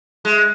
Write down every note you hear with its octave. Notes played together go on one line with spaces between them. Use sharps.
G#3